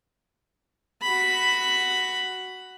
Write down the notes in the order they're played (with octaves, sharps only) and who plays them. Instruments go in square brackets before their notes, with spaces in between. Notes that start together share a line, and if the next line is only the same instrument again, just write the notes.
[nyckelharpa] F#4 B5